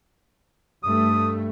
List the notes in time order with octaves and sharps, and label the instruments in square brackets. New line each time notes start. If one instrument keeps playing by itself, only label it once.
[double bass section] G2 A3 [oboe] D#6